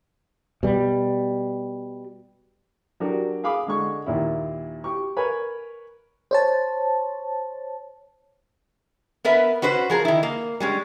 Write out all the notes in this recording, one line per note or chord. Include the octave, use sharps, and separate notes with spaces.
B2 G3
F#3 D4 F#4 G4 A#4
G#4 F5 B5 D6
D3 G#3 C#6
D#2 A#2 D#3 E4
G4 C#6
A#4 B4 C#5 G#5 B5
C5 C#5 A5
B3 A#4 B4 E5
C#4 F#4 B4 C5
F3 G#4 A#4
D#3 E4
A#3
G3 G#3 C#4